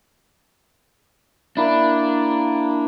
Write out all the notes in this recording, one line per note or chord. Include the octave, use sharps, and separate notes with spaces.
A#3 D4 E4